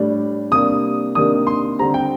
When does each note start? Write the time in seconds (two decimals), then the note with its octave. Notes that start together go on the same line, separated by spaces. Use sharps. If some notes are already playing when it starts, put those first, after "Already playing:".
Already playing: A2 G3 D4
0.51 C3 G3 A#3 D4 D#6
1.15 C3 D#3 A#3 D4 D#6
1.47 C6
1.79 D3 G3 C4 A#5
1.94 G5